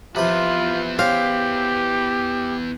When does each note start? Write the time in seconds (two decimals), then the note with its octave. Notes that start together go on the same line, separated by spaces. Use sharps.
0.16 E2 C3 F3 F4 B4 B5
0.99 C#4 G4 C5 F5 G5